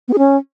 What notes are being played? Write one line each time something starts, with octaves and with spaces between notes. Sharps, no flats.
B3
G#4
C#4